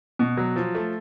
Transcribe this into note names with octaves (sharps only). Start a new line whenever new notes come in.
B2
F#3
F3
A3